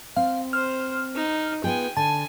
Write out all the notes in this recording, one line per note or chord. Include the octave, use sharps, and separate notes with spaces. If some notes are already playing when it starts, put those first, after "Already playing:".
C4 F5
C5 F6
D#4
B3 F4 G#4 G5 G#5
D3 G#5 A5